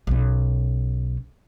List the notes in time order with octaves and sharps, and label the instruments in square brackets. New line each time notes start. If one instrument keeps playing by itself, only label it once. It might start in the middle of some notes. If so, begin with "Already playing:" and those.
[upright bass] B1 C#4